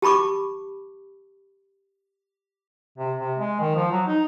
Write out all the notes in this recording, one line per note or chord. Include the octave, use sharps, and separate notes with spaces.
G4 A5 B5 C#6 D6
C3
C3
G#3
D#3
F3
F#3
D#4